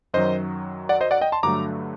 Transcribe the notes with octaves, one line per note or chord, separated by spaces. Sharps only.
F#2 D#3 F#3 C5 D#5
D5 F#5
C5 D#5
D5 F#5
D#5 G5
A5 C6
G2 D3 F#3 A3 A#5 D6